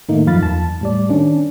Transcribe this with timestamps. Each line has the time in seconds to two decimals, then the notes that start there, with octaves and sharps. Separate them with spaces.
0.09 A2 D#3 A3 A#3 D#4
0.27 F#2 F3 F5 B5 A6
0.38 E2 A5
0.81 A2 G3 D5
1.09 D#3 C#4 D4